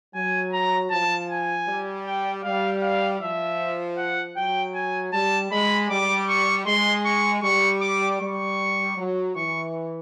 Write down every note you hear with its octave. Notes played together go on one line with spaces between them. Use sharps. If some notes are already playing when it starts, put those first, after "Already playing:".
F#3 G#5
A#5
F3 A5
G#5
G3
G5
G3 F5
F5
F3 E5
F#5
F#3 G5
G#5
G3 A5
G#3 B5
G3 D6
C#6
G#3 C6
C#6
G3 C#6
D6
G3 C#6
F#3
E3 C#6